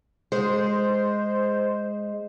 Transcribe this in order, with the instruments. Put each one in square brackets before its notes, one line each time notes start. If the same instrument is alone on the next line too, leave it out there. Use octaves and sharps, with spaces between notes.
[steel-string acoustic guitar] G#3 [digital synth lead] C5